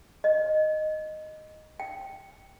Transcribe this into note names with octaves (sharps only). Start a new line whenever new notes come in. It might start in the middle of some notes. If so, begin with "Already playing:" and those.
D#5
G5